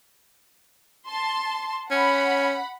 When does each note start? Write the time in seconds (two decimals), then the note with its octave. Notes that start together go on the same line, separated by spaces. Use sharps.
1.07 A5 C6
1.91 C#4 F#5 B5